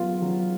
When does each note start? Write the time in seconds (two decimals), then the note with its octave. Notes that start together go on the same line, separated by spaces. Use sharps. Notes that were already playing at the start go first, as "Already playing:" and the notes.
Already playing: F#3 B3 F4
0.22 F#3